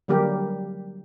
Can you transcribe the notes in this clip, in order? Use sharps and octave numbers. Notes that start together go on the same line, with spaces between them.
D3 F#3 G3 A#3 G4 A#4